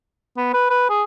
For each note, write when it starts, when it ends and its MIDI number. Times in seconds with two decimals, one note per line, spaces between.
0.37 0.53 59
0.54 0.67 71
0.70 0.87 71
0.89 1.03 68